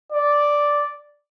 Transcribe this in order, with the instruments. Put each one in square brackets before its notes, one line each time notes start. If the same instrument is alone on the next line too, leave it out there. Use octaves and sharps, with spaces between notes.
[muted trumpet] D5